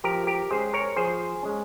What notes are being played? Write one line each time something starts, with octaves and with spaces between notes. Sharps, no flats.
F3 G4 A#4
G4 A#4
G#3 C#4 G#4 C5
A#4 C#5
F3 G#4 C5
G#3 C#4